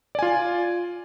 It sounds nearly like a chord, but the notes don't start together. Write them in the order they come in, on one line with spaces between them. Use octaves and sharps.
D5 G#5 F4